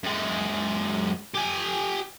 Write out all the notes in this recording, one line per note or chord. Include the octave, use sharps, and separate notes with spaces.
F#2 G#3
G4 G#5